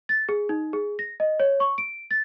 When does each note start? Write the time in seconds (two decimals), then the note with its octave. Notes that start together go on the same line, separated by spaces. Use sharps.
0.09 A6
0.29 G#4
0.49 D#4
0.73 G#4
0.99 A#6
1.20 D#5
1.40 C#5
1.60 C#6
1.78 D7
2.11 A6